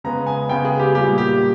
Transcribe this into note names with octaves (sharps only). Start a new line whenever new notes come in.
C#3 G#3 B3 A#5
G#5
C#3 G#3 B3 G5
G#4
G4
A#2 G3 A#3 G4
G4